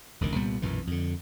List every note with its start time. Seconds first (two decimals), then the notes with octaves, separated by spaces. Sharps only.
0.21 E1 C#2 D#3
0.36 C2 A#2 G3 B3
0.62 B1 F#2 A#2 E3
0.87 F2 D3